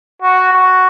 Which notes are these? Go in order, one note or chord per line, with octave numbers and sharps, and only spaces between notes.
F#4
F#4